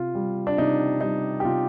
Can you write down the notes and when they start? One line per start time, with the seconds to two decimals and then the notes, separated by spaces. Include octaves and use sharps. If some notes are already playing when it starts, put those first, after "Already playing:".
Already playing: C3 F4
0.15 G3
0.47 D4
0.58 C3 D#4
1.01 G3 D#4
1.40 G4
1.44 C3 F4